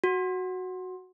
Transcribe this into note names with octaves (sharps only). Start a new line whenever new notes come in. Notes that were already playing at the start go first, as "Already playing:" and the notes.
F#4